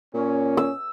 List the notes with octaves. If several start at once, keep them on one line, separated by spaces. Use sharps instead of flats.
A#2 C#4
E6